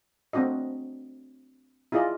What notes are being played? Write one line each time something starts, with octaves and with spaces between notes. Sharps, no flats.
A3 C4 D4 F#4 D#5
E4 F4 G#4 D5 D#5